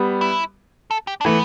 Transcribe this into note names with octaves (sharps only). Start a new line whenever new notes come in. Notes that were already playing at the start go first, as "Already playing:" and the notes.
Already playing: G3 B3
E4
A4
G4
D4
E3 A3 B3